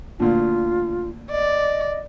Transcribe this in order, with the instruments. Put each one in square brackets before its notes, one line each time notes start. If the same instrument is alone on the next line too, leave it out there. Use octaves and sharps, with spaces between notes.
[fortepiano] D2 A#2 [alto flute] F4
[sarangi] D5 [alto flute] D#5